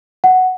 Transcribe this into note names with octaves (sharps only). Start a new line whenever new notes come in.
F#5